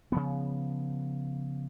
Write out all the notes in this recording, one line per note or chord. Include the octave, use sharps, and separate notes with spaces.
C#3 F3 B3